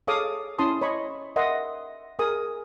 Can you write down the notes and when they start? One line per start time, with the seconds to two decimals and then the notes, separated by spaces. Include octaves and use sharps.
0.07 G#4 A4 C#5 F5 D6 D#6
0.58 C#4 E4 A5 C6 D#6
0.82 C#5 D#5 B5 C#6
1.36 A#4 D#5 E5 F#5 C6
2.19 G#4 A#4 G#5 D#6